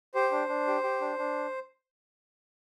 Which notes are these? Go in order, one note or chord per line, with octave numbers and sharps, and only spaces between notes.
G4 C5
D4
D4
G4
G4
D4
D4